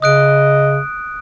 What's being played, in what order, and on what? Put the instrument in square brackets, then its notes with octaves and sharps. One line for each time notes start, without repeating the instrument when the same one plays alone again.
[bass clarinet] C#3 [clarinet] D#5 [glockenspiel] D#6 F#6 D7